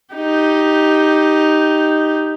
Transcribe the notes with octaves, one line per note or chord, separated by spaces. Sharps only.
D#4 G4